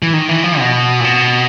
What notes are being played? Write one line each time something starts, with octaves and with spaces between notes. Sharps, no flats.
E3
D#3
E3
F3
B2
A#2
B2